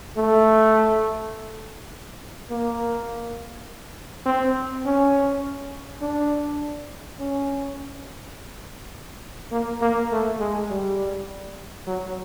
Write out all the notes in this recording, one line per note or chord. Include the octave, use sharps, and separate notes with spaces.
A3
A#3
C4
C#4
D4
C#4
A#3
A#3
A3
G#3
G3
F#3